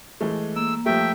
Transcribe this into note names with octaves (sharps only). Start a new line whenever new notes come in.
E3 G#3 A3
A#3 E6
F3 G3 A3 E5 G5